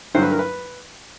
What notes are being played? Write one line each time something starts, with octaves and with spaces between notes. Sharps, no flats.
G2 D3 F#3 C5
B4
A#4
B4